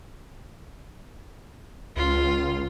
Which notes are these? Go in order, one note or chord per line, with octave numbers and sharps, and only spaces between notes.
C#2 F4